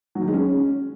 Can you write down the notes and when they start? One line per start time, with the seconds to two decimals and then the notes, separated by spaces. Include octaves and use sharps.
0.15 F#3
0.21 D#3
0.28 G#3
0.34 C#4